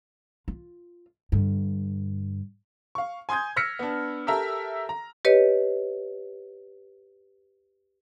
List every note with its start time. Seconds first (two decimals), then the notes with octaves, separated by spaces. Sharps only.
0.48 F4
1.32 G2 D3
2.95 F5 C#6
3.29 G#5 C6 D#6 G6 G#6
3.56 E6 F6 A#6 B6 C#7
3.79 B3 D4
4.27 G4 A4 A#4 E5 A#5
4.89 A#5
5.25 G4 B4 C#5 D#5